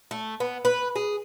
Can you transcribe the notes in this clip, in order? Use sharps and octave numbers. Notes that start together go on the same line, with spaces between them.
A3
B3
B4
G#4